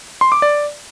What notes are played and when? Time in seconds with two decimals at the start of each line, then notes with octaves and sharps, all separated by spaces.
0.21 C6
0.32 D6
0.42 D5